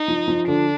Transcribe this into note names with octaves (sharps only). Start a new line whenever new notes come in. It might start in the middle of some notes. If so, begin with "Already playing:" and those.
Already playing: D#4
F3
F3
D3 D4